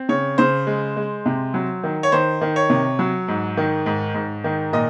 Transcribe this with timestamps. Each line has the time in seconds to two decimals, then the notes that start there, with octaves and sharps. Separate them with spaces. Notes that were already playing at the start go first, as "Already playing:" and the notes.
Already playing: C4
0.09 C#3 C#5
0.38 C#3 C5
0.67 G#3
0.97 G#3
1.26 C3
1.54 F#3
1.83 D#3
2.03 C#5
2.12 D#3 C5
2.41 D#3
2.56 C#5
2.70 C3
2.99 F#3
3.28 G#2
3.57 D#3
3.86 G#2
4.14 G#2
4.44 D#3
4.73 A#2 D#5